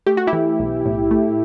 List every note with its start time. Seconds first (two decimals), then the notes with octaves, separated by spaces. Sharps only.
0.07 A3 G4
0.17 F#4
0.27 E4 G4
0.33 E3
0.59 B1
0.85 A2
1.11 A3